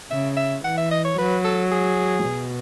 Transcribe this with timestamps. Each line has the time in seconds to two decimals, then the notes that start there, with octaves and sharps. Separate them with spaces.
0.11 C#3 E5
0.37 E5
0.64 E3 F#5
0.78 E5
0.91 D#5
1.05 C#5
1.17 F#3 B4
1.44 A4
1.72 G#4
2.26 B2